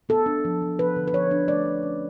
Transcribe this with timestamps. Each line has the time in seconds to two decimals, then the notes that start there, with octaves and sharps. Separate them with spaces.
0.09 B3 A4
0.26 D4
0.45 F3
0.62 F3
0.79 F3 B4
0.96 D3
1.08 B4
1.13 F3 C#5
1.31 D4
1.48 A3 D5
1.65 F3
1.83 C#4